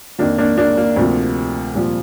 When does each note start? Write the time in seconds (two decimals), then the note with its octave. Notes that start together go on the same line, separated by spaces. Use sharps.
0.19 F2 D#3 A#3 D4
0.38 A#3 D4
0.58 A#3 D4
0.77 A#3
0.96 D2 C3 F3
1.74 C2 A#2 F3